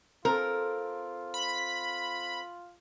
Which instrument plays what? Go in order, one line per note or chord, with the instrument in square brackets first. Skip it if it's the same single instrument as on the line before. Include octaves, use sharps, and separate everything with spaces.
[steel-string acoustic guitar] C4 A4 [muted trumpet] F4 [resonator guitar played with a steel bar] A#4
[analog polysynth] B5